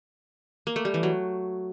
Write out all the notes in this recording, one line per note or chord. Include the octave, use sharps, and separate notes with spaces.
A#3
A3
G3
E3
F#3